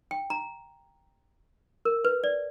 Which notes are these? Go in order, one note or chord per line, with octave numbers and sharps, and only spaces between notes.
G5
A#5
A#4
B4
D5